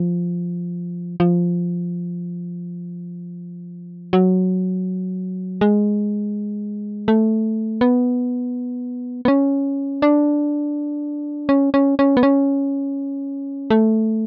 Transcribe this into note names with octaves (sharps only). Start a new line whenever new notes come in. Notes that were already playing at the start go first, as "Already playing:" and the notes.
Already playing: F3
F3
F#3
G#3
A3
B3
B3
C#4
D4
C#4
C#4
C#4
B3
C#4
A3